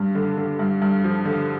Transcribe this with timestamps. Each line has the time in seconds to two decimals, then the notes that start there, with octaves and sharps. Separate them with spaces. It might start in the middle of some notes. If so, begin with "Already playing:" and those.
Already playing: G2
0.15 D3
0.37 D3
0.59 G2
0.82 G2
1.04 F3
1.25 D3